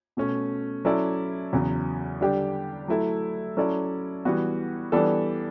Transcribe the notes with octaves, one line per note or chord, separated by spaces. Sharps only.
B2 A3 C#4
F#3 C#4 E4 A4 D5
E2 C#3 F#3
D3 G3 D4 G4
F#3 A3 E4 A4
F#3 C#4 E4 A4 D5
E3 G3 B3 F#4
E3 G3 B3 D4 A4